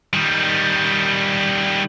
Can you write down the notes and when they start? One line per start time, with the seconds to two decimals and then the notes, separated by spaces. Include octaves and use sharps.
0.13 D#3 G3